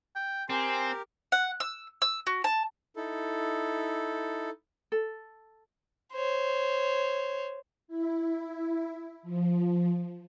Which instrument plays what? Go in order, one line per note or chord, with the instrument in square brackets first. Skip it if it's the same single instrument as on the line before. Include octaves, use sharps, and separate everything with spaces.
[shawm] G5
[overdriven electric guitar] C4 [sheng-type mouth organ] G4 A#4 [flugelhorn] G#5 [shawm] C6
[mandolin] F#5
E6
E6
F#4
A5
[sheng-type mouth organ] D#4 E4 A4
[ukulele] A4
[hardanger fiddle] C5 C#5
[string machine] E4
F3